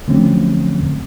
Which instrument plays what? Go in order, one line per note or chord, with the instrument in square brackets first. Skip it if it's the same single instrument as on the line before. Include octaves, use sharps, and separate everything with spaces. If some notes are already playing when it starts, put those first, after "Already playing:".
[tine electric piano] D3 F3 F#3 A3 C4 C#4